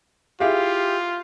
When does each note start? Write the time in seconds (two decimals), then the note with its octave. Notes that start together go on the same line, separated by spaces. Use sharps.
0.40 E4 F4 G4 G#4 F5